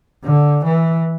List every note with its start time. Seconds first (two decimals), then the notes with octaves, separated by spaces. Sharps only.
0.23 D3
0.64 E3